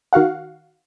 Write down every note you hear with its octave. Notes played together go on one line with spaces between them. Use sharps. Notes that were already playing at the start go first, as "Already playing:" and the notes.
D#3 F#4 F5 F#5